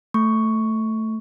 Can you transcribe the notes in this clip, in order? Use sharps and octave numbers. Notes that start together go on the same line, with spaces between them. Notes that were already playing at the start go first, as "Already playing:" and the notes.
A3 C#6